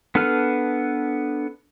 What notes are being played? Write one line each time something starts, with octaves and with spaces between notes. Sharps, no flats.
B3 D4 A4 B4 F6